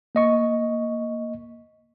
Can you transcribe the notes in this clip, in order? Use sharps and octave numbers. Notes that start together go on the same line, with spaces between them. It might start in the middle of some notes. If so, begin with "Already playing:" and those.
A#3 D#5 C#6